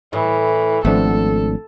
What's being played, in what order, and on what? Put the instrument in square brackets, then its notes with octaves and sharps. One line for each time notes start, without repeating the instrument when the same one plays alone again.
[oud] A2 [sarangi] E3
[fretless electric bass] G#1 F3 [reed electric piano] A3 C4 D4 [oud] B3 [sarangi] A4